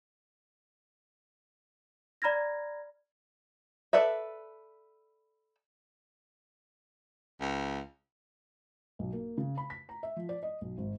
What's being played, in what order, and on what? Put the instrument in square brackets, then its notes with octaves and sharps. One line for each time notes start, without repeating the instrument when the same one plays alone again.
[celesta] D5 A#5 B5 F6 G#6 A#6
[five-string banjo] A4 B4 D5 E5
[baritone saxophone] C#2
[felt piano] B1
A#3
C#3
B5
B6
A#5
E5
F3
D5
D#5
B1
G#1